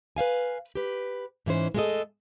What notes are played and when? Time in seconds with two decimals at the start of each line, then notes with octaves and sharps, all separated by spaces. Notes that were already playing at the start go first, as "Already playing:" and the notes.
0.16 B4 C#5 F5 G#5
0.75 G4 B4
1.46 G#2 E3 C#4 C5
1.74 G#3 A3 C#4 F#4 A4 D#5